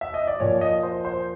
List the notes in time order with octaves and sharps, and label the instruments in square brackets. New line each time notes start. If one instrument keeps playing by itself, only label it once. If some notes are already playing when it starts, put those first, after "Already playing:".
[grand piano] E5
D#5
D5
A#2 F3 C#5
D#5
C5
C5